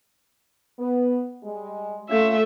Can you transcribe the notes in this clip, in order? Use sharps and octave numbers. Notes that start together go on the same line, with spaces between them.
B3
G3 G#3
A3 C#4 F4 E5